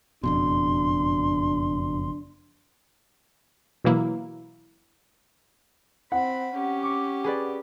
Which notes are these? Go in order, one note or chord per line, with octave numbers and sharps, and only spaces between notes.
F#1 F2 B2 D4 C6
B2 E3 F#3 A#3 E4
C4 F#5 B5
C#4 G4
C#6 D6
G#4 B4 D5